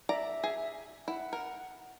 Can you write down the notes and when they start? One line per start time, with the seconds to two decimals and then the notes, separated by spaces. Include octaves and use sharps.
0.09 D5 E5 A#5
0.44 G#4
1.08 E4 F#5
1.33 A#4